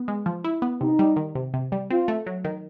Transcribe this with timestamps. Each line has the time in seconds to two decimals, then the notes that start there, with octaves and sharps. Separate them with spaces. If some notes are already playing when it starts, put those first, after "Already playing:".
Already playing: B3
0.08 G#3
0.26 F3
0.44 E4
0.62 B3
0.81 C3 D#4
0.99 G3
1.16 D#3
1.35 C3
1.54 C3
1.72 G3
1.90 C4 F4
2.08 A3
2.26 F#3
2.44 D#3